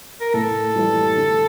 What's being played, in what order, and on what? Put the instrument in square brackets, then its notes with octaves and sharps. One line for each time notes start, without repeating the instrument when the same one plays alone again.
[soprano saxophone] A#4
[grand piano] A2 [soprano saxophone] A4
[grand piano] E3 G3
D3